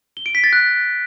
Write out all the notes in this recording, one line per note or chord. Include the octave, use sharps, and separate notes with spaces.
G7
D7
B6
A6
F#6